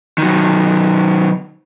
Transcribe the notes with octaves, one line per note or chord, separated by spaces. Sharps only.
D#3 F#3